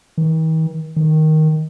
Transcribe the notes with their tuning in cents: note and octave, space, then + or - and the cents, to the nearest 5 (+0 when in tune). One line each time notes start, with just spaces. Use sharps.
D#3 +45
D#3 +5